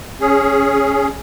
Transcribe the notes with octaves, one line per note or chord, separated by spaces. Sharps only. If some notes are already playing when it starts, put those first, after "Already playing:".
C#4 G#4